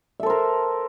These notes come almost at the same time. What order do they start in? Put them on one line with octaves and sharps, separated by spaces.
E5 A4 C5 A#4